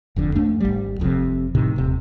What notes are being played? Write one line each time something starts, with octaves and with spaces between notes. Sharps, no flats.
F1 F2 D3
F2 A3 D4
G#1 G3
F1 F2 A2 C3
A2 C3 D#3
D#1 C3